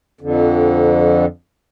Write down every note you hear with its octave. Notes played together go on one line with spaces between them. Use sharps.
F2 D3